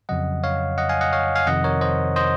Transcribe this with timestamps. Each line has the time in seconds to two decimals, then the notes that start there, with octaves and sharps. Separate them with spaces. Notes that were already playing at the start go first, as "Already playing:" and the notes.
0.09 F2 C#3 F#3 D#5 F#5
0.44 C#5 F5
0.78 D#5 F#5
0.89 F5 G#5
1.01 D#5 F#5
1.13 C#5 F5
1.36 F5 G#5
1.47 F2 C3 D#3 D#5 F#5
1.64 A#4 C#5
1.81 C5 D#5
2.16 C5 D#5